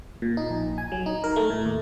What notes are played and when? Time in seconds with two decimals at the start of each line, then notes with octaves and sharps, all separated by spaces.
0.22 A#2
0.37 D#4
0.50 A#1
0.78 G#5
0.92 F#3
1.06 D#4
1.24 A#4
1.36 A3
1.50 A2
1.65 D#2